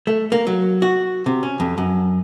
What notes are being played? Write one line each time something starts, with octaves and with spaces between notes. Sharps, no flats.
A3
A#3
F#3
F#4
C3
C#4
F2
F#2